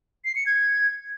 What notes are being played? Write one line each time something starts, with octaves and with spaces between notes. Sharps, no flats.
C7
C#7
G#6